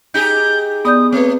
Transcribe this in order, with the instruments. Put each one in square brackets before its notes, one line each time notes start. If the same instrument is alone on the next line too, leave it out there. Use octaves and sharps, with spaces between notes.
[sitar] D#4 G4 G#4 [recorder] G6
[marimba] B3 D5 G6 [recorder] D#6
[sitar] A3 [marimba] C4 B4 [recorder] C#5